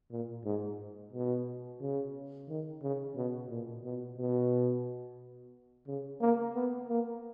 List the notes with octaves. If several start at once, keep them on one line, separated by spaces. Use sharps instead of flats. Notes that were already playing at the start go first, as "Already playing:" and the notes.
A#2
G#2
B2
C#3
D#3
C#3
B2
A#2
B2
B2
C#3
A#3
B3
A#3